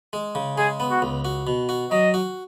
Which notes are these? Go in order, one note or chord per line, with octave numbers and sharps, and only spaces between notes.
G#3
C#3
G#3 G#4
B3
F#4
C#2
F#4
B2
F#4
F#3 D#5
F#4